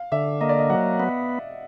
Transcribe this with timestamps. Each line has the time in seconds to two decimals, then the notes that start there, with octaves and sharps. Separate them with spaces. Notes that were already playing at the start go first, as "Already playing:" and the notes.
Already playing: F5
0.12 D3 E5
0.41 A#3 D#5
0.49 D5
0.58 D#5
0.70 F#3 F#5
1.00 B3